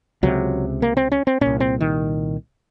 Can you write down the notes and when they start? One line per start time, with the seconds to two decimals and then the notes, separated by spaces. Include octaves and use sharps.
0.23 C#2 C3 F#3
0.82 A#3
0.97 C4
1.12 C#4
1.27 C4
1.41 C2 A#2 C#4
1.60 C4
1.81 D#3